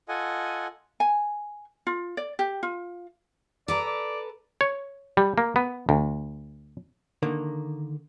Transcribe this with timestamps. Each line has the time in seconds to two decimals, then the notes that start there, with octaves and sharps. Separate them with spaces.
0.08 F4 A4 D#5 F#5 G#5
1.00 G#5
1.87 F4
2.17 D5
2.39 G4
2.63 F4
3.68 A4 B4 D5 A#5
3.86 D5
4.61 C#5
5.17 G3
5.38 A#3
5.56 B3
5.89 D2
7.23 D3 D#3 A#3